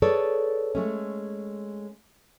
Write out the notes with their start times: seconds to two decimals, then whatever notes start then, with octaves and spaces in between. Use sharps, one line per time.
0.02 G#4 A4 B4 C#5 D5
0.75 G#3 A3 C#4